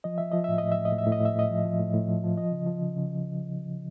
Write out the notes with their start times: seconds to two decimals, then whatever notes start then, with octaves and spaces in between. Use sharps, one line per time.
0.04 F3 D#5
0.18 F3 E5
0.32 F3 D#5
0.44 A2 E5
0.58 A2 D#5
0.72 E5
0.77 A2
0.85 D#5
0.93 A2
0.98 E5
1.07 A2
1.12 D#5
1.21 A2 E5
1.36 A2 D#5
1.50 F3
1.65 F3
1.79 A2
1.94 A2
2.08 F3
2.24 F3
2.37 F3 D#5
2.52 C#3
2.66 F3
2.82 C#3
2.96 C#3